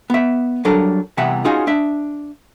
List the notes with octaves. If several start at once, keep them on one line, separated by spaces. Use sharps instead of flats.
B3 E5
F#3 G3 D4 A4 A#4
E2 C3 E3 G3 E5 F#5
C#4 D#4 F4 F#4 G#4
D4 E5